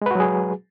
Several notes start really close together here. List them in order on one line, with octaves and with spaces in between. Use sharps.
G#3 B4 F#4 F#3 G#4